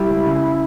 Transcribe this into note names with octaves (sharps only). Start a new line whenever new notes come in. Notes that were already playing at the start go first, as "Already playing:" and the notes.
Already playing: G3 E4
C#2
C#3